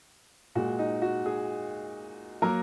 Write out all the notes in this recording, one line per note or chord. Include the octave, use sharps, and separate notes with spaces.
A#2 G#3 F#4
D#4
F#4
G#4
F#3 A#3 A#4